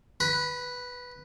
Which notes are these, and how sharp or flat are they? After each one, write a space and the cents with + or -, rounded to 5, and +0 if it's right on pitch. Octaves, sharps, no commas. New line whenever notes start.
B4 +0 B5 -35